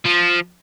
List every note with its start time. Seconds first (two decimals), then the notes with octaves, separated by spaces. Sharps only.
0.05 F3